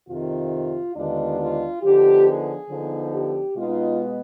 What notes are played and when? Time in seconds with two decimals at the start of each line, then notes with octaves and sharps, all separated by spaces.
0.08 F2 C3 D#3 F4
0.96 D#2 D3 G#3 B3 D4 F4
1.40 F4
1.83 D3 F3 B3 D#4 G4
2.27 G#4
2.70 D3 F3 B3 D#4
3.12 G4
3.56 B2 G#3 B3 D#4 F4